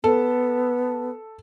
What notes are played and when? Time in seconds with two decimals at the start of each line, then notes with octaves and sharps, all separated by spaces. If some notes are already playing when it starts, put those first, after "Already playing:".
0.04 B3 A4